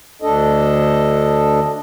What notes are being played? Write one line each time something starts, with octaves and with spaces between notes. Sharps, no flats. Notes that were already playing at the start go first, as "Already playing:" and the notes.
D2 D4 A4 D#5